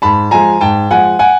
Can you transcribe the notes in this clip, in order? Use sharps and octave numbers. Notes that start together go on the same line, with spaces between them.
G#2 A5 B5
F3 G#3 G#5 A#5
G#2 G5 A5
F3 G#3 F#5 G#5
F#5 G#5